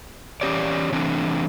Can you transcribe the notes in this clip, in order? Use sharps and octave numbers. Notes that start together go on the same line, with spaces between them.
E3 A3 C#4 G4 C#5 D5
E3 A3 C4 D4